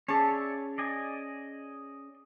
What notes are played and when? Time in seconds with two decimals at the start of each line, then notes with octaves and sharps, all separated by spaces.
0.08 C#4 G#4 C#5 D5 E5 A5 C#6
0.78 D5 D#5 G#5